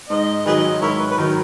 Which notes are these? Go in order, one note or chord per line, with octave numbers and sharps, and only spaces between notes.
G#2 D#5
D#3 F#3 G#4 B4 D#5
G#2 E4 A#4 C#5
B4
B4
D#3 F#3 D#4 A#4